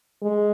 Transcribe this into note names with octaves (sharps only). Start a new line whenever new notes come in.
G#3